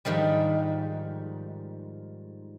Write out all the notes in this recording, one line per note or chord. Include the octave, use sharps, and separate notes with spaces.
G#2 D#3 F3 G3